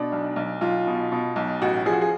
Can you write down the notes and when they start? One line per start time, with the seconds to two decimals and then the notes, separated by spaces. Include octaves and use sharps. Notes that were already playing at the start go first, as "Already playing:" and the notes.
Already playing: B2 D4
0.12 B1
0.36 B1
0.61 B1 F4
0.87 B2
1.12 B2
1.36 B1
1.62 A1 F#4
1.86 F3 G#4
1.93 F#4
2.01 G#4